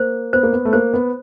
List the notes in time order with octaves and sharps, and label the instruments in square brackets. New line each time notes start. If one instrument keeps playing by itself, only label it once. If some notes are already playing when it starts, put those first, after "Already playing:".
Already playing: [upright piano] A#3 [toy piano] C5
[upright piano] B3 [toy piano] C5
[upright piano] A#3
B3
A3
[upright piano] A#3 [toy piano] C5
[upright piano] B3